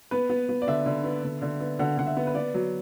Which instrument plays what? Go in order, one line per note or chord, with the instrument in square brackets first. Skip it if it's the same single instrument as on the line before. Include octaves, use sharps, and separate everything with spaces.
[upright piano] B3 B4
B3
B3
D5
D3 E5
D3
B3
D3
D3
B3
D3 F#5
D3 F#5
E5
B3
B4
B3 D5
F#3